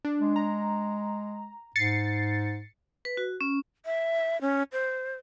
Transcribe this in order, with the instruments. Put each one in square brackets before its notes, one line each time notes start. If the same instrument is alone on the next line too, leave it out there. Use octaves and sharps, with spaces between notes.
[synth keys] D4
[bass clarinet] G#3
[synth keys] A#5
[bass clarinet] G#2 [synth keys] A6 C7 C#7
[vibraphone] B4
F#4
C#4
[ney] E5
C#4
C5